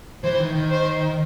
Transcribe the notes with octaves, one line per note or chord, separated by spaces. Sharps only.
E3 C5
D#3
D#3
C5